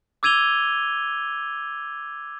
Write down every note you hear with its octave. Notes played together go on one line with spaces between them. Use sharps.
D6 E6 G#6 D#7 F7 G7